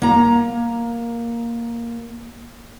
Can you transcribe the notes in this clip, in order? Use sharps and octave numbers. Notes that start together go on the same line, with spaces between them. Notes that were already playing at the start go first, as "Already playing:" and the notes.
A#3 A#5